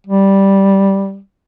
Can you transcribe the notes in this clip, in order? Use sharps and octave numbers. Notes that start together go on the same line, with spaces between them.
G3